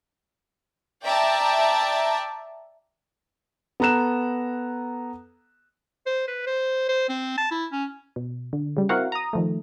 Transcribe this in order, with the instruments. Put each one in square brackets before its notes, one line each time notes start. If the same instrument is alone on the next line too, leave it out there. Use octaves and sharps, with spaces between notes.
[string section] D5 E5 G5 A5 A#5
[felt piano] B3 A4 A#5 F#6 E7
[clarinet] C5
B4
C5
C5
C4
A5
E4
C#4
[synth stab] B2
D3
C#3 G3
C4 E4 F#4 A#4 F5 F#5
A#5 D#6
D#3 F3 A3